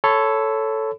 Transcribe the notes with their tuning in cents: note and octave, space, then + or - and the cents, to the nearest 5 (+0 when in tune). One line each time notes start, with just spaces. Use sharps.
A4 +0 C#5 +0 B5 +35